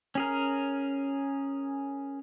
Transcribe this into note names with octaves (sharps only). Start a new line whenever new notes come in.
C#4 G#4 A#4